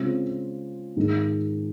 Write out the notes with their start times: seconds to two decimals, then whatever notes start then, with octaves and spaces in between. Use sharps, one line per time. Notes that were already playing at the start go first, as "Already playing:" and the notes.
Already playing: C#3 G#3 C4 F4
0.96 G#2 D#3 G#3 D#4